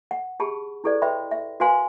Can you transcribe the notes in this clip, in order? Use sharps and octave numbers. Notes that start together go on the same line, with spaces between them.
F#5
G4 G#4 A5 B5
E4 G4 A4 B4 D5
B4 D#5 E5 G5 B5 C6
E5
F#4 A#4 B4 F5 G#5 C6